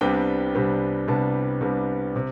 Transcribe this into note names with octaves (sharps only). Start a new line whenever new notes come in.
C2 C3 G3 B3 D4 G5
C2 C3 G3 B3 D4
C2 C3 G3 B3 D4 A5
C2 C3 G3 B3 D4
C3